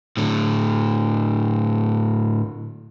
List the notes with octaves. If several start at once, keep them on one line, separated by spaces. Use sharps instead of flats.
A2 D3